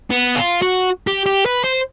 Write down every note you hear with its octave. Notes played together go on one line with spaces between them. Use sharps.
B3
F4
F#4
G4
G4
B4
C5